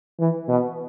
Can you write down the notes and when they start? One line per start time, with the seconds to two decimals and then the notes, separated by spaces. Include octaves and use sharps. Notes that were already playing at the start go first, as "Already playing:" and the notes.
0.20 E3
0.49 B2